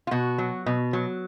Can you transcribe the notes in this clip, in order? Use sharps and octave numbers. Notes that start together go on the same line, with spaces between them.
F4
B2 F#4
F#3
B2
F#3